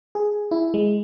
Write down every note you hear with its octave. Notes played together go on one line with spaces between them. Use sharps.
G#4
E4
G#3